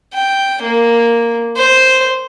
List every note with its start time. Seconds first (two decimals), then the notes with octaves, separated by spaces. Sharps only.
0.14 G5
0.62 A#3
1.56 C5